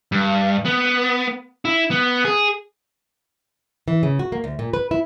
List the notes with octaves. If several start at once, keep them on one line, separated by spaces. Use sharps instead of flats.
G2
B3
E4
B3
G#4
E3
C#3
F#4
A#3
D2
A#2
B4
E4